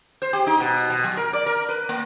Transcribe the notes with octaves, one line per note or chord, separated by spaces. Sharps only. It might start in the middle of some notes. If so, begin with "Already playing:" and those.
C5
G4
D#4
B2
B2
F#3
A#4
D5
A#4
B4
A#3